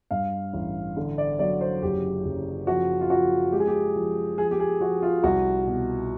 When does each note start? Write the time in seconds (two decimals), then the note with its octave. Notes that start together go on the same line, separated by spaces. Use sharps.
0.11 G2 F5
0.53 A1
0.97 D3
1.18 D5
1.39 F#3 D5
1.61 C5
1.82 F#1 G4
2.24 F#1
2.67 F3 F#4
3.01 F4
3.10 F3 F#4
3.52 G#3 G4
3.60 G#4
3.67 G4
3.95 F3
4.38 F3 G#4
4.51 G4
4.60 G#4
4.81 F3 F#4
5.02 F4
5.23 C2 F#4
5.67 B2